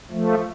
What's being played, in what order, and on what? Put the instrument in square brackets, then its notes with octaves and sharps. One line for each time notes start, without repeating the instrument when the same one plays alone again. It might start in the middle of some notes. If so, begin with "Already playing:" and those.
[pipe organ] F3 A3